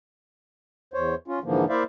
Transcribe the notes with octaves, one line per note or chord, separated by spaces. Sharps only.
E2 C5 C#5
C#4 F4
G#2 D3 E3 F3 A#3
A#3 E4 C5 D5 E5 F5